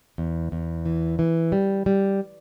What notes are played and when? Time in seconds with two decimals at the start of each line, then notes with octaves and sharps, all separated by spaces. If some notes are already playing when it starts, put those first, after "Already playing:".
0.18 E2
0.52 E2
0.86 E3
1.19 E3
1.52 G3
1.86 G3